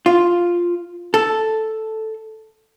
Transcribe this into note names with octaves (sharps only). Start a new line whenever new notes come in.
F4
A4